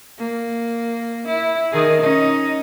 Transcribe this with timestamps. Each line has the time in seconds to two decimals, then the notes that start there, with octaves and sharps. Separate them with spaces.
0.18 A#3
1.27 E4
1.72 D#3 D#4 G#4
2.01 C#4 D#4